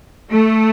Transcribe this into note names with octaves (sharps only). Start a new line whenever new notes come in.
A3